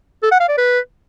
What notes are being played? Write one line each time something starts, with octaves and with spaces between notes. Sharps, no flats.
A4
F#5
F5
D5
B4